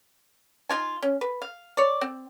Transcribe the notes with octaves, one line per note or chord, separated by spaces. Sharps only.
D#4 F4 G#5
C#4
B4
F5
C#5 D5
C4